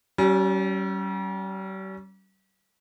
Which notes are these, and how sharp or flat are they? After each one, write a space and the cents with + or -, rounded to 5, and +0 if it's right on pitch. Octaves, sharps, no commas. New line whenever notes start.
G3 -40 C#4 +0